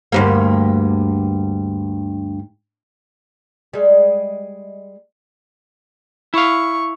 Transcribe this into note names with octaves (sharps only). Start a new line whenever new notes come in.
D2 G2 A#3
G3 G#3
E4 F5 C#6